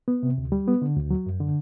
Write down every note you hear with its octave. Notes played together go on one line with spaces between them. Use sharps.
B3
C3
D2
G3
B3
D3
D2
F#3
F#2
D3